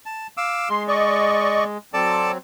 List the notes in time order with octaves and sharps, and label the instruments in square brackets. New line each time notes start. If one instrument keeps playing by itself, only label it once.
[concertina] A5
F5 D6 E6
[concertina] G#3 [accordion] C6
[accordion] D5 D#5 C#6
[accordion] F#3 C4 [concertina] A4 D5 A5